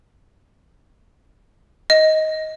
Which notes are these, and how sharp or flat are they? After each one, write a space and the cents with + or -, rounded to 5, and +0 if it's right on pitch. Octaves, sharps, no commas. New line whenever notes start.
D#5 +15